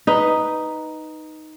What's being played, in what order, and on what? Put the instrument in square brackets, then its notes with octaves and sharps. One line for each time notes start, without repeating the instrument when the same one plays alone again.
[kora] D#4 B4